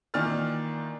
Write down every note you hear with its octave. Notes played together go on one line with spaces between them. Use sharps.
A#2 D#3 E3 D5 F6 A6